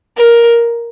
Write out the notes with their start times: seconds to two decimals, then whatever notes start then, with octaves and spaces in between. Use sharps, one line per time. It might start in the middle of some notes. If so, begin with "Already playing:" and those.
0.18 A#4